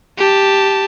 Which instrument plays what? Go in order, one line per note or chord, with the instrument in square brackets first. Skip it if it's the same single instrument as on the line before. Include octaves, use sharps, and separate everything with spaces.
[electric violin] G4 A5